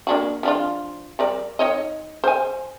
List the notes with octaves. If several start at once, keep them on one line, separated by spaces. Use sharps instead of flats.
A#3 D4 F#4
F3 D4 F4
G3 A#4 D5
D#4 C#5 D#5
C5 G#5